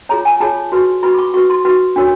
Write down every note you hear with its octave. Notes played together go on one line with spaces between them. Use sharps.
F4 G#4 C#5 A#5
G#5
F4 G#4 C#5 A5
F#4 B4
F#4 B4 B5
D6
C#6
F#4 B4 C#6
C6
F#4 B4
D4 F#4 A#4 C#5